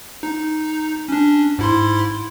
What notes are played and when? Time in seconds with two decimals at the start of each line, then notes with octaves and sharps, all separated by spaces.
0.23 D#4
1.08 C#4 D4
1.59 G#2 E4 C6